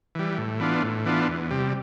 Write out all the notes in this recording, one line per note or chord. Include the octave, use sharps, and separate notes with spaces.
E3 G3
A2
E3 B3 D4 F4
A2
E3 B3 D4 F4
E2
C3 G3